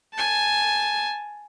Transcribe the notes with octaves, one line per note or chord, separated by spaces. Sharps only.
G#5 A5